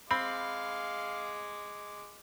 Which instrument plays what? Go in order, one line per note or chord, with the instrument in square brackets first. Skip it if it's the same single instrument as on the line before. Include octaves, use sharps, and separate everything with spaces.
[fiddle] G#3 D6 [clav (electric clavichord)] C4 [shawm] F5 [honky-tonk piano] B5